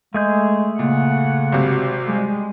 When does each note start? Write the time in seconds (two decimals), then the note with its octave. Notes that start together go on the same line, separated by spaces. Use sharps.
0.14 G#3 A3 G#4 G6
0.79 A#2 C#3 F#5
1.52 G#1 C3 F#3
2.05 G3 G#3